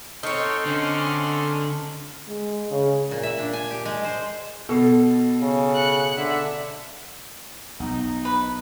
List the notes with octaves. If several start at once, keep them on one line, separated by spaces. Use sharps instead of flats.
C4 D#4 A4 C#5 C6 F6
D3 C#4
G#3
C#3
A#2
E5
D4
G#5
G4
G#3
C5
B2 A4
C#3
F#6 C#7
D3 E5
B1 D#4
B4